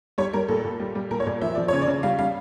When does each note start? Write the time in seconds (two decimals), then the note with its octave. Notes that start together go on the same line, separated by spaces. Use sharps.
0.18 G3 C#5
0.33 G3 A#4
0.48 A#2 A4
0.64 A#2
0.80 G3
0.95 G3
1.11 A#2 A#4
1.20 C#5
1.27 A#2 D5
1.41 F3 E5
1.55 F3 D5
1.68 C#3 C#5
1.82 D5
1.87 C#3
2.03 G3 F5
2.19 G3 F5